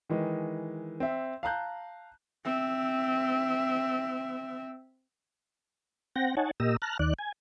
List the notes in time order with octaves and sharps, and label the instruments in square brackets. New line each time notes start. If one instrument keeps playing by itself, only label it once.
[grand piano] D#3 E3 G#3
C4 E5
F5 A5 A#5 F#6 G6
[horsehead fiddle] C4 E5
[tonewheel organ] C4 F#5 G5 A#6
D#4 C#5 F#5 G#5 A5
A#2 A#3 G4 D#5 A#5 E6
A5 A#5 F6 F#6
D#2 D#3 D5 F#6
G#5